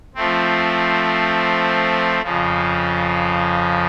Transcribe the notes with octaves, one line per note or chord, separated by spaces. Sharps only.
F3 A3 C4
F2 C#3 F3